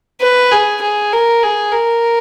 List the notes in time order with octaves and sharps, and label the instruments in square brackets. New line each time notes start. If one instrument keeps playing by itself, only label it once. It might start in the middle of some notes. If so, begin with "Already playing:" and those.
[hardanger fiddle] B4
G#4
G#4
A#4
G#4
A#4